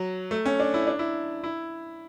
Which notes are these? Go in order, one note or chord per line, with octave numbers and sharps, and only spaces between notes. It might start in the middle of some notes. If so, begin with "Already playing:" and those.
Already playing: F#3
A3
C#4
D4
E4
D4
E4
E4